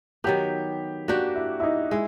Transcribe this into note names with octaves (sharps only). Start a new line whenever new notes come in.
D#3 F#3 B3 G4
A#3 D4 F#4 G4
E4
E4
D#4
G#3 E4